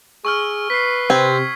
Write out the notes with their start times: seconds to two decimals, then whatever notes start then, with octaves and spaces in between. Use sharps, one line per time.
0.25 G#4 C#6 E6 F6
0.70 B4 B6 C7
1.10 C3 C4 G#6